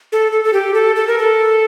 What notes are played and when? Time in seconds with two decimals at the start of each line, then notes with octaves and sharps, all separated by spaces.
0.12 A4
0.32 A4
0.44 A4
0.53 G4
0.74 A4
0.96 A4
1.07 A#4
1.18 A4